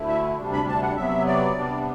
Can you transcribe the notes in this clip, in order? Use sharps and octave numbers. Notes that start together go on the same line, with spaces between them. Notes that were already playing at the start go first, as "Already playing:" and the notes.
Already playing: D2 D3 A3 E4
E5
D2 C3 G3 D4
B5
A5
F#5
C3 F#3 B3 E5
D5
C3 G3 B3 D4